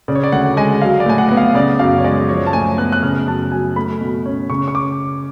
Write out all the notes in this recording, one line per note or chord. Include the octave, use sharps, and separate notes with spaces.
C#3 D5
C#5
D5
D2 F#5
G#3 G#5
F#3 F5
D5
A2 G#5
F#5
B3 F#5
F5
C#3 D5
F#2 F5
C#5
G#3 D5
F3 C#5
A5
A2 G#5
B3 F#6
F#6
C#3 F6
F#2 A5
F#3 G#5
A3 B5
B2
C#4
C#3 C#6
C#6
D6